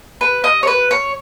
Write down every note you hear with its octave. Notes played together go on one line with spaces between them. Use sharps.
B4
D#5
C#5
B4
C#5